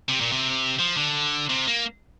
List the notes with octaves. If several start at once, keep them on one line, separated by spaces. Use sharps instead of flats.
C3
A#2
C3
F3
D3
C3
A#3